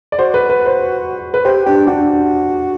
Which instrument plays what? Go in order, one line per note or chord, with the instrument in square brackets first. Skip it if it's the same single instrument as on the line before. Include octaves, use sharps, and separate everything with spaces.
[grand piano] D5
[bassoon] F#4 [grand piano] C5
[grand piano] B4
B4
C5
B4
[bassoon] G4 [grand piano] C5
[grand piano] D4 [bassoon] G4
[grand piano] D4 [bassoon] F#4